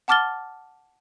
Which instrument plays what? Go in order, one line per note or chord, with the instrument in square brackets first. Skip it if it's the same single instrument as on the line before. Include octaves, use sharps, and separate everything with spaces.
[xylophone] F#5 A5 D6 F6 A6 G7